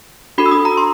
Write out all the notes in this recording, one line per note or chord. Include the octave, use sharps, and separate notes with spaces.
D4 F#4 A4 B5
E6
D#6
A#5
C6